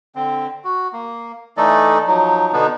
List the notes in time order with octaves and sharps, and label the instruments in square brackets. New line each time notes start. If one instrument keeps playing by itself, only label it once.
[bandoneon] D3 C4
F#4
A#3
E3 A3 D#4 A4 D5 D#5
F3 F#3 D#4
B2 D3 B3 D4 D#4